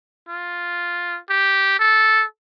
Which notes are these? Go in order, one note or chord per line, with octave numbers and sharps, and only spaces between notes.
F4
G4
A4